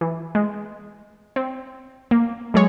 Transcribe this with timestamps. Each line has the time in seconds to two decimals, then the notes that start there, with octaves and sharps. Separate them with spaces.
0.01 E3
0.35 G#3
1.36 C4
2.11 A#3
2.54 F#3 G#3 G#4 C#5